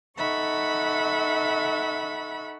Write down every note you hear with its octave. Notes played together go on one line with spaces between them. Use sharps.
D#4 A4 E5 F#5 B5 C#6